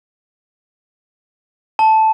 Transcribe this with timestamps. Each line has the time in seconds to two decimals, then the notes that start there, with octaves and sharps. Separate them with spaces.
1.79 A5